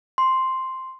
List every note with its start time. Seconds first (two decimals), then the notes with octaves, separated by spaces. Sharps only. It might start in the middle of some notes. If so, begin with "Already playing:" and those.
0.18 C6